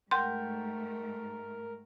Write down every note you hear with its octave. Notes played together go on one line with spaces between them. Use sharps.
G#2 A3 A#4 F#5 G5 C6 G6